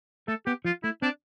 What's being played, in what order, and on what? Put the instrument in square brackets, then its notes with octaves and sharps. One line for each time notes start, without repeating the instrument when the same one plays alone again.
[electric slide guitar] A3 [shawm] A4
[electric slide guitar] B3 [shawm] G4
[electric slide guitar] F3 [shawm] F4
[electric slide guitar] A3 [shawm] E4
[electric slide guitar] C4 [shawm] D4